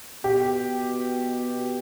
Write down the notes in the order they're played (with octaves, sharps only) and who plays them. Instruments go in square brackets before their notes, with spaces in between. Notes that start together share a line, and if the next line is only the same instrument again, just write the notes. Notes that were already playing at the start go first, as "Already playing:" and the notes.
[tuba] B2 [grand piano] G4